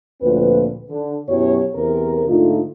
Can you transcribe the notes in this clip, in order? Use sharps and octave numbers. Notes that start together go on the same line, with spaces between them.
D2 A#2 F3 C4 B4
D3
F#2 B2 F#3 E4 G4 C#5
E2 C3 C4 A#4
G#2 D3 A3 D#4 F4